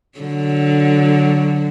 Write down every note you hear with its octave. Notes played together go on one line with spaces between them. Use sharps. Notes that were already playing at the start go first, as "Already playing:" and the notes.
D3 F#3